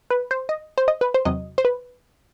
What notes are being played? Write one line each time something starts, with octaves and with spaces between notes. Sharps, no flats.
B4
C5
D#5
C5
D#5
B4
C5
E2 C3 F#3 D#5
C5
B4